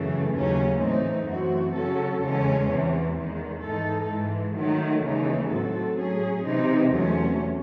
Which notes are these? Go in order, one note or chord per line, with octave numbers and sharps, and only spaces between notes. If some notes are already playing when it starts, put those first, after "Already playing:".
Already playing: F#2 C#3 E3 A3
D#2 C#3 F#3 C#4
A2 E3 A3 C4 D#4
F#2 E3 A3 C4 F#4
C#3 F#3 C#4 F#4 A4
E2 C#3 G#3 C#4
E2 C3 E3
E2 D#3 G#3
G#2 E3 G#3 D#4 A4
G#2 E3 G#3
D#3 F#3 A3
D#2 C#3 E3 G#3 D#4
A2 F#3 C4 F#4 A4
A2 F#3 C#4 G#4
C3 E3 C4 D#4
E2 C3 F#3 A3 C#4